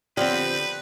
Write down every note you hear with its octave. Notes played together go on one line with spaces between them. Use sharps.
D3 F3 C4 G4 B4 D5